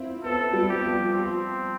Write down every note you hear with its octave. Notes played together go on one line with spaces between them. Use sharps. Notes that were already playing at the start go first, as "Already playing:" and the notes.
Already playing: C4 E4 F4
B3 A4
G3
G4
F3
F3 C4